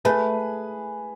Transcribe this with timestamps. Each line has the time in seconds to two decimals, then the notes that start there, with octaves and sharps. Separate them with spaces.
0.05 A3 G#4 B4